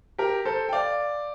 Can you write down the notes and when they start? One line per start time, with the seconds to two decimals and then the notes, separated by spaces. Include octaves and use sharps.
0.18 G4 A#4
0.45 A4 C5
0.69 G5
0.72 D5 F5